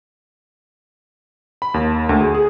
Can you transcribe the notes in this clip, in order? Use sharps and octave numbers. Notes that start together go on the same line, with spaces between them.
B5
D#2
D2
G#4
G#4